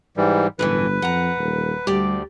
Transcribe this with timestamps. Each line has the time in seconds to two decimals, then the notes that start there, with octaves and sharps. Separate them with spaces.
0.17 G#2 E3 G3
0.59 G1 F#2 A2 E3 B4
1.02 F2 F#5 A#5
1.38 D#1
1.87 D2 G3 G4 D5